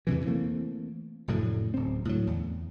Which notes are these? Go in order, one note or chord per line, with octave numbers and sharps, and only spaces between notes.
E2 G2 C3 E3
E3 A3 A#3 C4
F1 F#2 A2 D3
D1 C4
A2 D3 F#3
E2